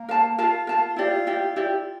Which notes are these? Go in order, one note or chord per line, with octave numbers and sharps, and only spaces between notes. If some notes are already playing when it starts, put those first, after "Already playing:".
Already playing: A#3
A#4 F5 A5
F4 A#4 F5 A5
A#4 F5 A5
E4 F4 G4 D5
E4 G4 D5
E4 F4 G4 D5